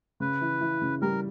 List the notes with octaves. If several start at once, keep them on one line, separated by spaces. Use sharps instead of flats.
C#3 B4
E3
E3
C#3
G3 A#4